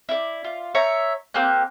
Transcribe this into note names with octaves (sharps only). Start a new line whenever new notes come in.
E4 D5
F4
C#5 E5 A#5
A#3 C4 G4 F#6